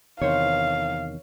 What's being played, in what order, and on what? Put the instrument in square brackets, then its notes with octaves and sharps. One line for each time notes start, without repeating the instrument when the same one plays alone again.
[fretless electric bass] E2 C3 D#3 [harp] C5 C#5 [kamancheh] F5